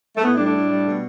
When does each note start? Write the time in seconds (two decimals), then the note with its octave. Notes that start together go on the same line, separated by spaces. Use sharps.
0.16 A3
0.23 A2 B3
0.34 A3 D4
0.39 G3
0.45 A3 D4
0.55 A2
0.71 G3
0.87 B2